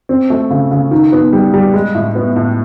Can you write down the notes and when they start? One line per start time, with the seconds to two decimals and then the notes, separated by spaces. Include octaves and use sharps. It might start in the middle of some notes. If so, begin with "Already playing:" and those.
0.09 C4
0.30 A3
0.50 C#3
0.71 C#3
0.91 D#3
1.12 B3
1.33 G3
1.54 G3
1.74 G#3
1.95 A2
2.15 B3
2.36 A2